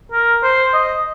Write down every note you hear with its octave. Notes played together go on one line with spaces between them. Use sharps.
A#4
C5
D#5